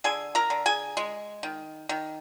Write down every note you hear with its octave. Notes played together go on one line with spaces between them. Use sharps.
D3 G#4 G#5
A#4 A#5
D3
G#4 G#5
G#3
D#3
D#3